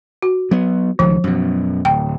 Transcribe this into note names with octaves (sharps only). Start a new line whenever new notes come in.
F#4
F#3 B3
C#2 D#3 F3
F#2 B2
D1 G5